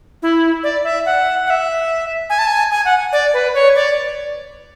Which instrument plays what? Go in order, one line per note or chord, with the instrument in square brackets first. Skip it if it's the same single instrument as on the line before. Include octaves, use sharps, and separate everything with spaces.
[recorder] E4
D5
E5
F#5
F#5
E5
G#5
A5
G#5
G#5
F#5
D5
B4
C#5
D5